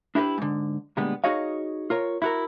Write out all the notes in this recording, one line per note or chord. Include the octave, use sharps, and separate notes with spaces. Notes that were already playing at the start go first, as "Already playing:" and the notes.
D4 E4 G4 A#4 B4
G#2 D3
A#2 D3 G3 G#3 B3
D#4 F#4 G#4 C#5 D#5 F5
F4 A#4 C#5
E4 F#4 A#4